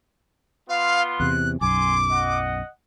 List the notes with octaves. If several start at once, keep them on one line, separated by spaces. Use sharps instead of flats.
B3 F4 F5 C6
E2 C3 F#6
B1 F#2 G#5 C6 D6
D#5 F#5